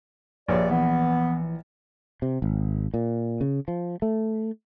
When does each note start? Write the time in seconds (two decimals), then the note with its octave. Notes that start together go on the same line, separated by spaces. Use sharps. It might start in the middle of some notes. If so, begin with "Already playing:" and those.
0.48 A#1 G2 C#5 D5
0.70 E3 B3
2.22 C3
2.42 G#1
2.94 A#2
3.41 C#3
3.68 F3
4.02 A3